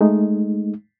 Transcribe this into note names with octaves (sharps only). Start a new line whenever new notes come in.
G#3 A3 D#4